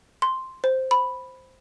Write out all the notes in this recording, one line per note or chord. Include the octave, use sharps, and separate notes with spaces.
C6
C5
B5